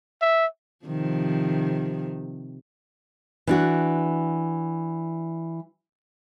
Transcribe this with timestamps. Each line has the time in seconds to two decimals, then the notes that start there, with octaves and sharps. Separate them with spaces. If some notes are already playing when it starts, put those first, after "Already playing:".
0.21 E5
0.85 C3 D#3 F3
3.47 E3 D4 F#4